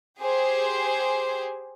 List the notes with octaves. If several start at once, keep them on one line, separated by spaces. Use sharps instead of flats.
G4 G#4 C5